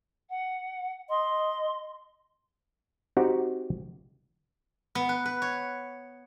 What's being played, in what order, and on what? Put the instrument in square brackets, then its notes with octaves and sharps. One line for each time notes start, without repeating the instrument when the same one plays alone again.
[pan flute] F#5
[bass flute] D#5 [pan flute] C6
[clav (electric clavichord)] C4 D#4 F#4 G4 F#5
[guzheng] B3
B4
B4
C#5